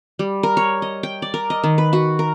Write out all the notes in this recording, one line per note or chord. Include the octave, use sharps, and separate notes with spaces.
G3
A#4
C#5
D#5
G5
D5
A#4
D#5
D#3
B4
F#4
A#4